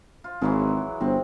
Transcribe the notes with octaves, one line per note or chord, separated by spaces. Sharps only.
F4
G#1 E3 F#3 G#3
G1 C4